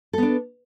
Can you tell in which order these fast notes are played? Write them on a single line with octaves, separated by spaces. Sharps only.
A4 B3 D4